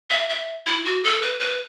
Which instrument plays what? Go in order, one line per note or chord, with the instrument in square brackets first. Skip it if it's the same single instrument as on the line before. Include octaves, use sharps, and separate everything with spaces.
[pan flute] E5
E5
E4
F#4
A4
B4
B4